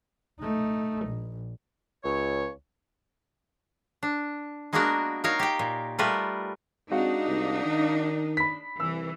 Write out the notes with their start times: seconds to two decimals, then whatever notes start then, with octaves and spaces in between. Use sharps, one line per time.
0.40 A3 D#4
1.06 A#1
2.04 C#2 C#5
4.03 D4
4.73 G#3 A#3 B3 D4 F#4 A#4
5.24 D#4 F#4 A#4 C#5 F5
5.39 G4 G5
5.59 A#2
5.99 G3 A3 F4 A#4 B4
6.91 G#3 C4 D4 D#4 F#4 F5
7.27 C2
7.65 D#3
8.37 B5 B6
8.80 C2 E3 E6